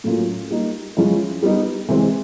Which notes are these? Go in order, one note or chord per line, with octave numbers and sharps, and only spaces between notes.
A2 F#3 A#3 C#4 F4
G3 A#3 D#4
F3 G#3 C#4 E4
G3 B3 D#4
C3 E3 G#3 C4 E4